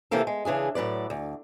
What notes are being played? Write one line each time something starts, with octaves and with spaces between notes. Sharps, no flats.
C3 E3 F3 A3 A#3 A4
G#3
C#3 E3 D4 G#4
A2 F#3 B4 D5
D2